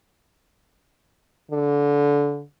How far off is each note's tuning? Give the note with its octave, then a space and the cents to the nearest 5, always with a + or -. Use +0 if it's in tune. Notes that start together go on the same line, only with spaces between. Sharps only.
D3 -25